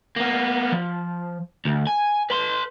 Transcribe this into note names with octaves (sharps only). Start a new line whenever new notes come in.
A#3 B3
F3
D2
G#5
B4 C6